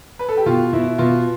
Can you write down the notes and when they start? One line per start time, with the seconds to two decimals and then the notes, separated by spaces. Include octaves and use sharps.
0.19 B4
0.29 A4
0.37 G4
0.46 B2 F4
0.73 B2 E4
0.98 B2 F4